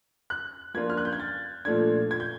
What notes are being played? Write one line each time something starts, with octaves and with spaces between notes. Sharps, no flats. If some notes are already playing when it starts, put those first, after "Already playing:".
F#6
F3 A#3 D4 F4 G#6
F6
F#6
G6
G#6
A6
A#2 F3 A3 D4 G#6
G#6
G6